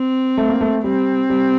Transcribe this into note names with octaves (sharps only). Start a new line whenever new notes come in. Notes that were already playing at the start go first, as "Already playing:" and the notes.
Already playing: C4
A3
A#3
A3
G3 C4
G3